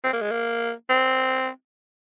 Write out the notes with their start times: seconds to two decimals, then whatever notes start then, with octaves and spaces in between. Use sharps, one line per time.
0.04 C4
0.13 A#3
0.22 G#3
0.31 A#3
0.90 C4